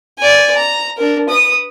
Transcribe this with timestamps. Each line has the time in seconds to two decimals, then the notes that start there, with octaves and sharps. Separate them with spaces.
0.18 D5 G#5
0.57 A#5
0.97 D4 A#4
1.29 B4 D#6